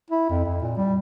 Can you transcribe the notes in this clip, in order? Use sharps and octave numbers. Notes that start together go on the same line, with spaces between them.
E4
F2
F2
A#2
G3